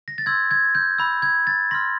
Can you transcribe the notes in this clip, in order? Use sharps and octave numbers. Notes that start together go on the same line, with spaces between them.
A#6
A6
C6 E6 G6 G#6
G#6
G6
B5 E6 G6
G#6
A6
C6 F6 A#6